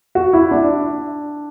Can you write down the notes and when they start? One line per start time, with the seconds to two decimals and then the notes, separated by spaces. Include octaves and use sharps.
0.15 F#4
0.33 E4
0.51 D4